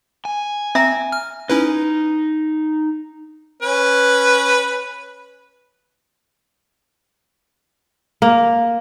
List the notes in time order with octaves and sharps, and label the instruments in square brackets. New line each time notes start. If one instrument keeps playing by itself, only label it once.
[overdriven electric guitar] G#5
[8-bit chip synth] C4 [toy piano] E5 A#5
[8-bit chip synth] F6
[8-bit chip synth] C#4 E4 B4 [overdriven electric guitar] D#4
[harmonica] C#4 B4
[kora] A#3